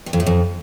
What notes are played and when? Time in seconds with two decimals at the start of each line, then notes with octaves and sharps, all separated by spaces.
0.06 G2
0.13 F2
0.20 A2
0.27 F2